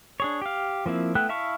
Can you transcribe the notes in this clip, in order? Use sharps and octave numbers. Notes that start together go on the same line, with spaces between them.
D4 G#4 C#5
G4 F5
F3 A#3 C4 E4
A3 B3 E4 G5 F#6
E4 E5 F5 A5 C#6